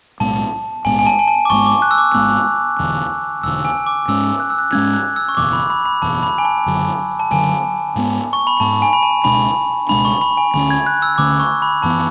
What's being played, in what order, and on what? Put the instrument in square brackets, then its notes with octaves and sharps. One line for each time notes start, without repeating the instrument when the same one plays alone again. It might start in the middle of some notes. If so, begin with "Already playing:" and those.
[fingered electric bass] B1 A2 G#3 B3 [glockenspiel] A5
[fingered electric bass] B1 A2 G#3 B3 [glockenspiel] G#5
[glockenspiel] G#5
A5
G#5
A5
D6
[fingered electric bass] G#1 G#2 G#3 B3 [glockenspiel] C#6
[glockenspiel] D6
F#6
E6
D6
[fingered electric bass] G#1 G#2 G#3 B3 [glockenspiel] F#6
[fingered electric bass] E1 E2 D3
[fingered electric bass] E1 E2 D3 [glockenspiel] E6
[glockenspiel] G#5
D6
[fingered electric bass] G#2 G#3 C#4 [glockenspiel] E6
[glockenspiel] F#6
E6
F#6
[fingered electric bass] G#2 G#3 C#4 [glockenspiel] G#6
[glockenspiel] F#6
E6
C#6
[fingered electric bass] F#1 E2 B2 [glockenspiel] D6
[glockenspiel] B5
B5
B5
[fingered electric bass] F#1 E2 B2 [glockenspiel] A5
[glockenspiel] B5
G#5
A5
[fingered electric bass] F#1 F#2 D3 F#3
[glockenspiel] A5
[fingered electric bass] F#1 F#2 D3 F#3 [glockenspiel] G#5
[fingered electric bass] G#2 G#3 B3
[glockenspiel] C#6
B5
[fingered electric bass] G#2 G#3 B3 [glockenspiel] A5
[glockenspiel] G#5
B5
A5
[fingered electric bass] C#2 B2 G#3 D4 [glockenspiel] B5
[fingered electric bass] C#2 B2 G#3 D4 [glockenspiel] B5
[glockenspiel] C#6
B5
G#5
[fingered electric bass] D2 D3 A3 C#4 [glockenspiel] B5
[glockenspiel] G#6
F#6
E6
[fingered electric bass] D2 D3 A3 C#4 [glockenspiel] D6
[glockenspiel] C#6
B5
[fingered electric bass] F#2 E3 B3 [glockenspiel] A5